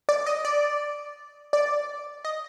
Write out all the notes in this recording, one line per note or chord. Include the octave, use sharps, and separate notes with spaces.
D5
D#5
D5
D5
D#5